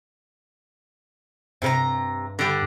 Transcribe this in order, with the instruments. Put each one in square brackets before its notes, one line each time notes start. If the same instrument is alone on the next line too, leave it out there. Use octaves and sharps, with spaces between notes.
[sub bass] G2 [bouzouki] C3 A#4 A#5
[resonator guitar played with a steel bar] D3 G3